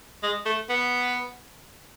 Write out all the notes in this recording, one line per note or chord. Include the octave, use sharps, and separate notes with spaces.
G#3
A3
B3